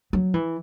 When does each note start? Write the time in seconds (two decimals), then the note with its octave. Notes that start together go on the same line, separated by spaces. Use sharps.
0.13 F#3
0.34 E3